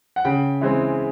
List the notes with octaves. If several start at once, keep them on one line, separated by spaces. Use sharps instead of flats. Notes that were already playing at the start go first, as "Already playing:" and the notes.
F#5
C#3 G5
E3 G#3 C4